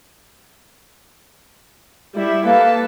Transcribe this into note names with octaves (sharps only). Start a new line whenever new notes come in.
G3 E4 E5
A#3 A4 B4 A5